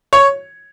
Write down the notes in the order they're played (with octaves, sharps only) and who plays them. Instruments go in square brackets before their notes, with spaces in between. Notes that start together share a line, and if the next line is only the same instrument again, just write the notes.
[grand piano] C#5